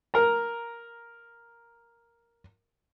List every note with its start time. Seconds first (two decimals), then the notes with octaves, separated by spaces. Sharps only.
0.14 A#4 A#5